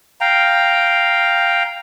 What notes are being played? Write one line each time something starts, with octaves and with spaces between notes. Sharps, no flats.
F5 G5 A#5